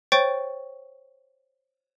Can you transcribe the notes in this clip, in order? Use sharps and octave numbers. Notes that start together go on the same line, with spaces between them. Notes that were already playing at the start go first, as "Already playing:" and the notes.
C5 C#5 G5 C#6 A6 D7